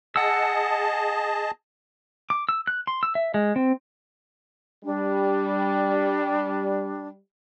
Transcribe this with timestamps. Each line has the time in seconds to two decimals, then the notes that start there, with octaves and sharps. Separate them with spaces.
0.16 G#4 D#5 F#5 A5 E6
2.30 D6
2.49 E6
2.67 F#6
2.87 C6
3.03 E6
3.15 E5
3.34 G#3
3.56 C4
4.84 G3 D4